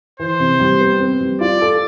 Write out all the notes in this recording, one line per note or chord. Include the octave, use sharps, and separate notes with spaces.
E3 C5
C3
G3
B3
C4
G3
F4 D5
A4